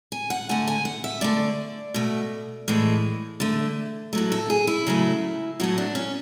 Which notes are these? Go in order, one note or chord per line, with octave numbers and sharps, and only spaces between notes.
G#5
F#5
D3 A3 G#5
G#5
F#5
E5
D3 A3 D5
B2 A3
A2 E3 G#3
D3 A3
A2 F#3 A3
A4
G#4
E4
C#3 F#3 A3
A2 F#3 A3 F#4
D4
C#4